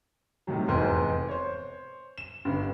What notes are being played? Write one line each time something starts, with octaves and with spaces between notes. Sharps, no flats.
A2 C3 D#3 F#3
F1 E2 G#2 C5 G#5
C5 C#5
E7
G1 G2